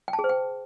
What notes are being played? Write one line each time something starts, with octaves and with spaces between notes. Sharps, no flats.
G5
A5
G#4
C5
G5